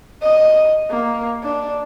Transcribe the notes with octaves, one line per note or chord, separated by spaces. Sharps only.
D#5
A#3
D4